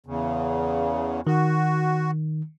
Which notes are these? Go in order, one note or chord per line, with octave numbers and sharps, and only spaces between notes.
E2 C#3
D#3 F#4